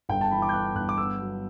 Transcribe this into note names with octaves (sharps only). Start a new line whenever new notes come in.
G1 G5
A5
E3 B5
D6
G6
B3 F#6
G1 F#6
D6
B3 E6
F#3